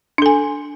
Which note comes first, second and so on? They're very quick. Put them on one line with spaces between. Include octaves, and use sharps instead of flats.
D4 A4 G#5